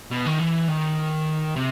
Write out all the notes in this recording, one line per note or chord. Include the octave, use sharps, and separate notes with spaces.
B2
D#3
E3
D#3
C3